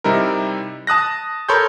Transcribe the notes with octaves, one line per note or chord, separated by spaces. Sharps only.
C3 G3 D#4 E4 A#4
A5 D#6 F#6 A#6
A4 A#4 C#5 B5 C6 G6